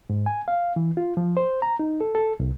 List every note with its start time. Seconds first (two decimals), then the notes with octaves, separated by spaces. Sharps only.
0.10 G#2
0.26 G#5
0.48 F5
0.76 E3
0.97 F4
1.17 F3
1.37 C5
1.62 A#5
1.79 D#4
2.01 A4
2.15 A4
2.40 C2